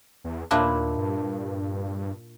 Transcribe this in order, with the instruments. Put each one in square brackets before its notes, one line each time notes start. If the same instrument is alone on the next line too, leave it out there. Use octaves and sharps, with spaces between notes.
[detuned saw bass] E2
[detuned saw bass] D#2 [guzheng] A#2 D4 E4
[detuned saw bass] G2